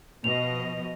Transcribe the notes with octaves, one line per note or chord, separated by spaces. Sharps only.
B2 F3 D#5 F7